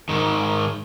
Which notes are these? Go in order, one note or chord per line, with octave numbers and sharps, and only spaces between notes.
G#2 D#3